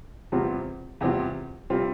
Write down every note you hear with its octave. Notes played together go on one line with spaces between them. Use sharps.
E2 C3 G3 C4 F4
E2 C3 G3 C4 F4
C3 G3 C4 F4